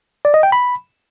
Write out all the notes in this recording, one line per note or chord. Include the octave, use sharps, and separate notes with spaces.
D5
D#5
G5
B5